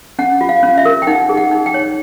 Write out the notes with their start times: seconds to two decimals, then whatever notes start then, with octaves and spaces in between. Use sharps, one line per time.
0.19 C#4 F#5
0.41 F4
0.49 F5
0.63 C#4
0.78 E5
0.85 A#4
1.02 G5
1.07 D#4 F#5
1.29 G#4
1.37 F#5
1.51 D#4
1.66 G5
1.74 C#5